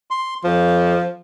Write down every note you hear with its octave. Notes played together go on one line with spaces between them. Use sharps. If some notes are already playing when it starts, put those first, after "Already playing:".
C6
F2 F3